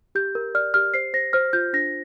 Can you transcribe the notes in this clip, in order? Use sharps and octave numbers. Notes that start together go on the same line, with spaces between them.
G4 G6
A#4
D5 F6
G4 F6
C5 C7
C5 A#6
C5 F6
F4 G6
D4 A#6